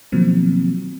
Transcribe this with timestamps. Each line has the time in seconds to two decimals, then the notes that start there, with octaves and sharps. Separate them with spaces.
0.12 B2 D#3 F3 F#3 A#3 C4